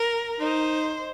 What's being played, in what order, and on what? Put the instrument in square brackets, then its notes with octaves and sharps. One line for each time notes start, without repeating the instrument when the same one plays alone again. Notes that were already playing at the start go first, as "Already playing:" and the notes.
Already playing: [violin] A#4
[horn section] D#4 [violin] C5